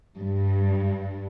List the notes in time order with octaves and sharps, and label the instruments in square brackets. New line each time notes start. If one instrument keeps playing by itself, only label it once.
[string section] G2